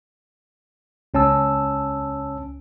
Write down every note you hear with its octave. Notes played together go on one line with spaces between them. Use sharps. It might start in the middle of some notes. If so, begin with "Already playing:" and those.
C#2 C#4 A5 E6